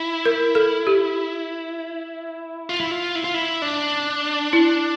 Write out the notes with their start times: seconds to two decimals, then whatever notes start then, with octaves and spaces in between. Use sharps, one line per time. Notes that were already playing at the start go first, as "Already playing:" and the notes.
Already playing: E4
0.25 A#4
0.55 A4
0.87 G4
2.69 F4
2.80 E4
2.91 F4
3.15 E4
3.24 F4
3.34 E4
3.62 D4
4.53 E4